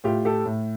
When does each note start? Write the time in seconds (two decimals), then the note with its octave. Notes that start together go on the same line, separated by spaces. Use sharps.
0.04 A2 F4 G4
0.25 G4 A4
0.46 A2